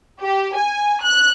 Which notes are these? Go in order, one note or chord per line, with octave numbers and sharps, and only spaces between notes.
G4
G#5
F#6